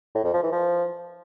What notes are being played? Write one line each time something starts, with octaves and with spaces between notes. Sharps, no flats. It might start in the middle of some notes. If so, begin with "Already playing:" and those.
A2
F2
F3
E3
F3